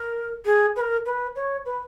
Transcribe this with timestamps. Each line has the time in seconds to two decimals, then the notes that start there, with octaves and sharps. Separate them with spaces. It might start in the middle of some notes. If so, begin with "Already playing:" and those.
Already playing: A#4
0.45 G#4
0.76 B4
0.81 A#4
1.06 B4
1.36 C#5
1.65 B4